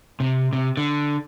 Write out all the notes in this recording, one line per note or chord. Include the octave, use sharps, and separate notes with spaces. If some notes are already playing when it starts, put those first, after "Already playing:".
C3
C3
D3